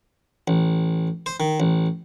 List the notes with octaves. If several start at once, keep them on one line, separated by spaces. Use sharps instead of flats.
A1
C5
D#3
A1